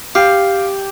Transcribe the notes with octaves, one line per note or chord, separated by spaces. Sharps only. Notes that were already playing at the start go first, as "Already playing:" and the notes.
G4 F5